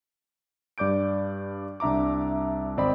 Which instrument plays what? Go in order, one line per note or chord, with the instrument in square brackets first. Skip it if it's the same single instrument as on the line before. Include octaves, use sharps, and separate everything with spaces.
[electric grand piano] G2 D5 D6 G6 D7
C2 D4 E5 A#5 D6
G#1 C4 D5 D#5 B5